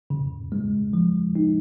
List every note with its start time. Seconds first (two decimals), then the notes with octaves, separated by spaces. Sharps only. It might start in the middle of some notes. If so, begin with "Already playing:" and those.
0.10 C#3
0.52 G#3
0.93 F3
1.35 D#4